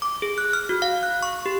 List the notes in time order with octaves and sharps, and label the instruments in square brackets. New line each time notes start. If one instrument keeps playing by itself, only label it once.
[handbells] D6
G#4
F#6
F6
F#4
F5
F#6
C#6
G4